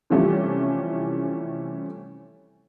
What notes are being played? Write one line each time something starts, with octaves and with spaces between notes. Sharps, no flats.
C3 E3 F3 G3 A3 C#4